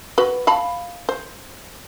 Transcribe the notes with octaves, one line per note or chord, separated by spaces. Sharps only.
F#4 B4
F5 A5 B5
C5